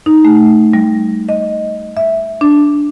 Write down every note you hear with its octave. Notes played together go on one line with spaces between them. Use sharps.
D#4
A3
G3
D#5
E5
D4